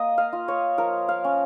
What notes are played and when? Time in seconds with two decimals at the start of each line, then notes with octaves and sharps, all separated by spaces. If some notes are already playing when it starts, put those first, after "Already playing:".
Already playing: A#3 D#5
0.18 F5
0.33 F4
0.48 C#5
0.78 F3 A#4
1.09 F5
1.24 C#4